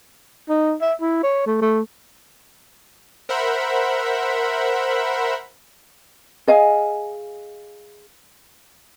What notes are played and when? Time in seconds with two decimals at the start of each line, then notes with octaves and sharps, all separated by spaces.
0.49 D#4
0.82 E5
1.01 E4
1.23 C#5
1.47 A3
1.61 A3
3.29 A#4 C5 E5 F#5 B5
6.47 G#4 D#5 F5 G#5